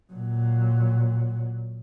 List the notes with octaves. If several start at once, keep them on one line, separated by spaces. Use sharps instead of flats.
A#2 F#3